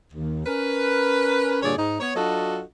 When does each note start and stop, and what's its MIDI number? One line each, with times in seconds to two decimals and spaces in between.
0.13 0.45 39
0.45 1.59 61
0.45 1.59 70
0.45 1.59 71
1.63 1.74 43
1.63 1.74 46
1.63 1.74 50
1.63 1.74 68
1.63 1.74 73
1.63 1.74 74
1.78 1.99 44
1.78 1.99 63
2.00 2.15 59
2.00 2.15 73
2.16 2.61 54
2.16 2.61 62
2.16 2.61 65
2.16 2.61 66
2.16 2.61 69
2.16 2.61 75